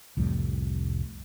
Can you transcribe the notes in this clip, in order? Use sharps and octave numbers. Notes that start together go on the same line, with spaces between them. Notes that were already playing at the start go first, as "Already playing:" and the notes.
C2 F2 A2 G3